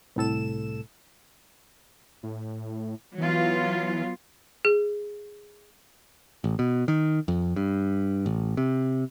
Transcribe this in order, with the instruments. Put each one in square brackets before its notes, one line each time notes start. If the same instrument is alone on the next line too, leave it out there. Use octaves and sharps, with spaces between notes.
[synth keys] C2 A2 A4 E7
[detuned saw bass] A2
[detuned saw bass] E3 [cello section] F#3 B3 F4
[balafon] G#4
[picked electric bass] A1
B2
D#3
F2
G2
A1
C3